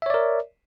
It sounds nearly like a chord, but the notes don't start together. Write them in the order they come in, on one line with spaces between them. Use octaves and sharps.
E5 C#5 D5 A#4